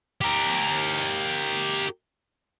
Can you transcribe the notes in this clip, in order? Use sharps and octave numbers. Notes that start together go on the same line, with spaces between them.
G4 A#4